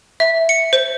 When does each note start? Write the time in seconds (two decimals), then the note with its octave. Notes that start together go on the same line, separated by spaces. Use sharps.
0.20 E5
0.49 C#7
0.73 C5